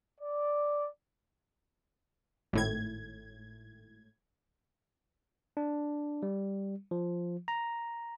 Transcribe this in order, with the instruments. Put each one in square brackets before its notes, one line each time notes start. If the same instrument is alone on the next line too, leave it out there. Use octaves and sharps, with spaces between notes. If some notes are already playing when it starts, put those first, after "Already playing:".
[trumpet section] D5
[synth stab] G#1 A2 G#6
[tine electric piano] D4
G3
F3
A#5